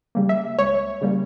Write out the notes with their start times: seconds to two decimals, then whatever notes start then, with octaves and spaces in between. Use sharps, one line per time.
0.15 C#3 G3 A#3
0.29 E5
0.58 C#2 C#5
1.01 C#3 G3 A#3